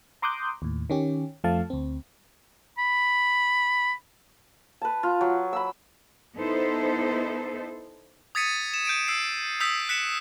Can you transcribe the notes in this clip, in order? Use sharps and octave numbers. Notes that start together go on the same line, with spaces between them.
A#5 C6 D6 D#6 F#6 G6
D#2 A2
D#3 C#4 G4
F2 F3 A3 F5 A5
D2 C4
B5
B4 A5
F4
F#3
B5 E6
B3 D#4 E4 A4 C5
D#6 G#6 A6 B6 C#7 D#7
E7
G6 D7 D#7
E6 C7 D7
D#6 E6 G6 B6
F#6 B6 C#7 E7